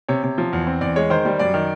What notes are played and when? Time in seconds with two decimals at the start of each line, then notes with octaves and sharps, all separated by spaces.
0.09 C3 C#5
0.24 C3
0.38 F3
0.53 E2
0.67 C4
0.81 E2 D5
0.96 G#3 C#5
1.10 D#3 C5
1.25 G3
1.39 F#2 D5
1.54 D#3